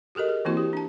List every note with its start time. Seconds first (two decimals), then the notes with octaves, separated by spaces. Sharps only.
0.15 F#4 G4 A4 A#4 D#5
0.28 G#4
0.45 E3 A#3 C4 E4 F#4 C#6
0.57 G4
0.73 D4 A5